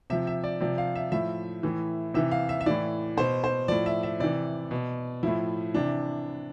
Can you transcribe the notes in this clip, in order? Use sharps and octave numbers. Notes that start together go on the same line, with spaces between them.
C3 F3 E5
E5
D5
C3 F3 D5
F5
E5
A2 F3 E5
A2 E3
C3 E3 E5
F5
E5
E5
A2 E3 D5
B2 C5
C5
A2 F3 D5
E5
E5
C3 E3 D5
B2
A2 F3 E4
C3 E3 D4